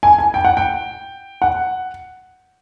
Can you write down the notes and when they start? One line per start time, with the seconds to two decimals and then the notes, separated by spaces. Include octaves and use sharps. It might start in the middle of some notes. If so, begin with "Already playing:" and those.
0.03 G#5
0.18 G#5
0.34 G5
0.45 F#5
0.57 G5
1.42 F#5